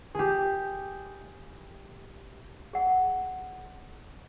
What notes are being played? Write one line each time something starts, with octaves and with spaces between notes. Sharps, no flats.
G4 G#4
G#4 F#5